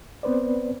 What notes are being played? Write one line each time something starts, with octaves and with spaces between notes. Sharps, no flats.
B3 C4 B4 C5 D5